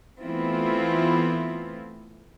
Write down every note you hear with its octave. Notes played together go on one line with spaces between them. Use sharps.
E3 A3 B3 C4 E4 F4